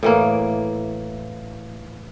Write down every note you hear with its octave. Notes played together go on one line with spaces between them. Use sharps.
A2 E3 A#3